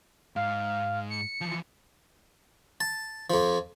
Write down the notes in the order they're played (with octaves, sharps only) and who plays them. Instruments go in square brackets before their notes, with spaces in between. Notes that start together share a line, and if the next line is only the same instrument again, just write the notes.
[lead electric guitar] G#2 [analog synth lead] F5
[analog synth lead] C#7
[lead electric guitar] E3 F3
[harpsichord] A5
F2 F3